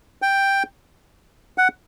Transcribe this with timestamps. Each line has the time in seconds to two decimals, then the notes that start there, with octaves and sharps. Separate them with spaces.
0.22 G5
1.58 F#5